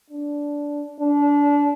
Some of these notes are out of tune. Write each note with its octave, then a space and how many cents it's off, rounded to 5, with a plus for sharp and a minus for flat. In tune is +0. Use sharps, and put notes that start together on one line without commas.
D4 -15
D4 -25